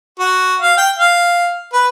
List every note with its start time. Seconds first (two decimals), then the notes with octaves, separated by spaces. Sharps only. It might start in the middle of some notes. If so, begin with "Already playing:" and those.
0.20 F#4
0.61 F5
0.77 G5
0.98 F5
1.73 B4